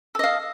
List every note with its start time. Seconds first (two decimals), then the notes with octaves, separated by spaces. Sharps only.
0.15 A4
0.19 D#5
0.24 F5